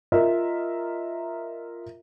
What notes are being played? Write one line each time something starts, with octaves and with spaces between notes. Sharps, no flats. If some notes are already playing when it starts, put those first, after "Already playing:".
F4 A#4 D#5 E5